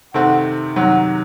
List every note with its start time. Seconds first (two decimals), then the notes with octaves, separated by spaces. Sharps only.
0.14 C3 D#3 A3 C4 F#5
0.76 C3 D#3 F#3 F#5